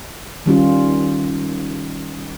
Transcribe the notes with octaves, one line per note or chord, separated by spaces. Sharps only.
D#3 G3 C#4 F4